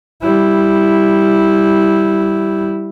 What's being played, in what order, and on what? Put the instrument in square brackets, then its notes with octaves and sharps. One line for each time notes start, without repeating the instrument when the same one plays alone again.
[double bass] G3 E4